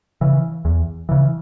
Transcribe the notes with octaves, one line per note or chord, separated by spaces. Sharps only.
C#3 E3
E2
C#3 E3